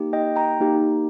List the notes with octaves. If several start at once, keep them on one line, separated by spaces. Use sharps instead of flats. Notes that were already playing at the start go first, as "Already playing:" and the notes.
Already playing: A#3 D#4 G4
D#5 G5
G5 A#5
A#3 D#4 G4